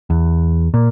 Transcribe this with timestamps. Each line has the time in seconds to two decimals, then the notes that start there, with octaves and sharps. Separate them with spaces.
0.10 E2
0.74 A#2